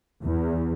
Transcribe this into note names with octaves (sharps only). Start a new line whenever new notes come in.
E2